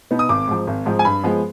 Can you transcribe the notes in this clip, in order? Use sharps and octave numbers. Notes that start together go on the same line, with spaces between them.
B2 B3 D#4
D#6
G#1 D6
G#2 F3
G#1
G#2 F3
G#5
G2 B5
F3 G#3 B3